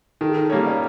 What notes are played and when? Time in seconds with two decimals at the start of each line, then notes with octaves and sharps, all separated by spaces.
0.21 D#3 A4
0.29 G#4
0.37 A4
0.50 G3 A#3 C#4
0.67 D5